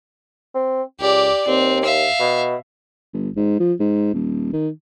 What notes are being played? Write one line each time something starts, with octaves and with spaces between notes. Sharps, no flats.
C4
C#2 G4 D5
D#2 C4
E5 F5
B2
G1
G#2
F3
G#2
D#1
D#3